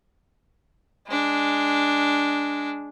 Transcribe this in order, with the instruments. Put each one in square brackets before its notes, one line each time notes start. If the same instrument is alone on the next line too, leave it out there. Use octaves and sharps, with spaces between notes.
[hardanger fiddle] G#3 D4